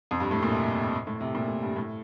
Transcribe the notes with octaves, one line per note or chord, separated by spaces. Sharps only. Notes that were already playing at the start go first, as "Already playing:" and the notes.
F2
G2
A2
A#2
C3
A2
C3
A#2
A2
G2
A2